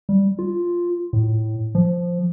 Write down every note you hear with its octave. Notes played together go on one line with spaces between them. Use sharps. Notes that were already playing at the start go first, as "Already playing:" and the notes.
G3
F4
A2
F3